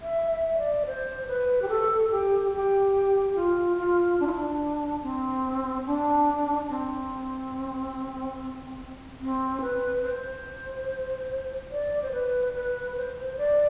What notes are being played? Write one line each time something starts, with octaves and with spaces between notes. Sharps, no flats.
E5
E5
D5
C5
B4
G4
A4
G4
G4
F4
F4
D4
E4
D4
C4
D4
C4
C4
B4
C5
D5
C5
B4
B4
C5
D5